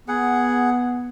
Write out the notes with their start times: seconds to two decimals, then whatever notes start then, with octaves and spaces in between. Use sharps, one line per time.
0.08 B3 G#4 F#5